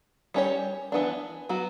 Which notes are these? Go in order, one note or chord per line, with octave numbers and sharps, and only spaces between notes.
G3 C#4 G4 C#5
E3 B3 D4
F#3 B3 F#4